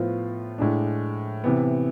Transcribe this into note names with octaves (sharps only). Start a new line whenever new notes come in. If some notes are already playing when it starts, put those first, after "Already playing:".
Already playing: A2 F3 B3 F4
A2 G#3 D4
C3 E3 B3